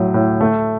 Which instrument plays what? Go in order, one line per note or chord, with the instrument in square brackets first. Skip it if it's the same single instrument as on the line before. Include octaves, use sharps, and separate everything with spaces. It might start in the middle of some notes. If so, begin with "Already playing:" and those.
Already playing: [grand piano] A2 F#3
A2
A3